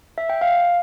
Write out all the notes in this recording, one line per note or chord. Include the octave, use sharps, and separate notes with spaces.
E5
G5
F5